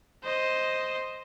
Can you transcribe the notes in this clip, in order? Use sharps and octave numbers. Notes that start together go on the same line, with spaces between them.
C5 D#5